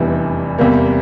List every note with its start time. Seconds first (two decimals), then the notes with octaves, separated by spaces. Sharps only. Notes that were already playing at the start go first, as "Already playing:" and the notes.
Already playing: F1 E2 E3 G3 D4
0.58 E2 C3 G3 A#3